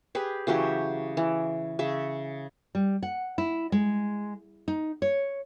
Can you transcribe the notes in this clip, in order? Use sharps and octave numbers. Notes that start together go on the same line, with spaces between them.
G4 G#4 B4
C#3 E3 F#3 G4
E3
C#3 G#4 E5
G3
F#5
E4
G#3
D#4
C#5